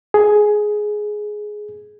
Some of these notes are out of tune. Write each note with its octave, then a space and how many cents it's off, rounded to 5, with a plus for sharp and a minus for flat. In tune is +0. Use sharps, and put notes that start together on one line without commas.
G#4 +10